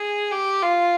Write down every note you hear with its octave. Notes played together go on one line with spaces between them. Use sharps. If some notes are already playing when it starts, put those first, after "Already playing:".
Already playing: G#4
G4
F4